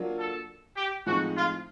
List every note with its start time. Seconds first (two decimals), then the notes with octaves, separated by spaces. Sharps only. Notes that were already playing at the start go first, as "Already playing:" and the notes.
Already playing: F#3 A#3 D4 F4
0.19 A4
0.77 G4
1.06 A2 F3 G#3 C4 D#4 F#4
1.36 F4